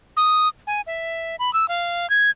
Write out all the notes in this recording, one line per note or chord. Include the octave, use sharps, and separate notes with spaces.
D#6
G#5
E5
B5
E6
F5
G#6